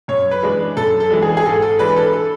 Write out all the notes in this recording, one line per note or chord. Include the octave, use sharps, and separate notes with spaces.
F#2 C#5
B4
E3 G#3 D4
F#2 A4
A4
E3 G#3 D4
G#4
G#4
G#2 A4
A4
E3 G#3 D4 B4
A4
A4